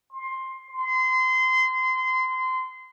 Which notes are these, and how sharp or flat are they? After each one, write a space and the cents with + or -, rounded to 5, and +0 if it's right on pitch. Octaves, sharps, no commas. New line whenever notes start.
C6 +15
C6 -25